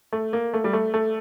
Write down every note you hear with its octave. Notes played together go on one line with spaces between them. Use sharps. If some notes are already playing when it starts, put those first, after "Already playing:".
A3
A#3
A3
G3
A3
A3